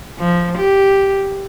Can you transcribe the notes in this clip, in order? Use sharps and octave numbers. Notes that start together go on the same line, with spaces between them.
F3
G4